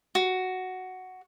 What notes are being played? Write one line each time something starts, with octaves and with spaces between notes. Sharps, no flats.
F#4